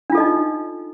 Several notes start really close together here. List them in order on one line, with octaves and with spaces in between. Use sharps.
D4 F4 A4 D#5 D#4